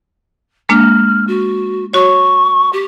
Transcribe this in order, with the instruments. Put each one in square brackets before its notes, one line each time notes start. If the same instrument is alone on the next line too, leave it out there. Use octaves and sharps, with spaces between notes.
[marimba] G#3 A#3 D4 [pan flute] F6
[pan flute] F#4
[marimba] F#4 C#5 [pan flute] C#6
[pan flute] G4